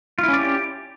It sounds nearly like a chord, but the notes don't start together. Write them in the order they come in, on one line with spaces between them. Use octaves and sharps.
F4 E4 C#4 D5 G4